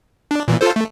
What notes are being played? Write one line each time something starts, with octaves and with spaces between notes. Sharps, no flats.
D4
A#2 E3
F4 A4 C5
A3